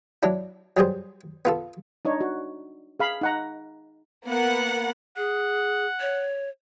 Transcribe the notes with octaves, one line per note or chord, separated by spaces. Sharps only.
F#3 D4 E4
F#3 G3 G#4 C5
B3 F4 A4
D4 D#4 C#5
F#4
G#4 F5 B5
D#4 F#5 A#5
A#3 B3 F#5
G#4 F#5
C#5